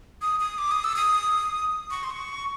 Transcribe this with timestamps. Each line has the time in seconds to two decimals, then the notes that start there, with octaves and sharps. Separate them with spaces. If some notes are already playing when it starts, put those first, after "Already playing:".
0.22 D#6
0.40 D#6
0.58 D6
0.71 D#6
0.84 E6
0.96 D#6
1.91 C#6
2.04 C6
2.10 C#6